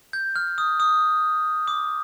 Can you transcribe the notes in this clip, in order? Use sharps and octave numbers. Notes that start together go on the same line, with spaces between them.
G6
F6
D#6
D#6
D6